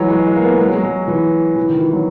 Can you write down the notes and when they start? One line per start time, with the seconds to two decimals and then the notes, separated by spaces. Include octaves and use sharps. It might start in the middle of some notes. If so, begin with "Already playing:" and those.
Already playing: E3 F#3 G#3
0.10 G#3
0.27 G#3
0.36 A#3
0.42 B3
0.59 G#3
0.66 F#3
0.75 G#3
0.83 F#3
1.08 E3
1.56 E3
1.69 D#3
1.81 E3
1.93 F#3